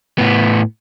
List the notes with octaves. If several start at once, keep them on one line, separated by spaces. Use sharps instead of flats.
A2 B3